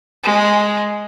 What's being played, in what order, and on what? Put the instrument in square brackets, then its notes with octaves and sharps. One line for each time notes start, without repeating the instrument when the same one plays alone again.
[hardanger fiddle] G#3